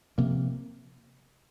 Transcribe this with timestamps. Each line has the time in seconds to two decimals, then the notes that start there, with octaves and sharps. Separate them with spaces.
0.18 C3 F3 A#3